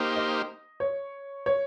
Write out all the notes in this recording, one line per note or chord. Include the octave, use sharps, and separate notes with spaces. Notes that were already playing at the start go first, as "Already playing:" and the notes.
Already playing: A#3 D#4 G4 C5
D#5
C#5
C#5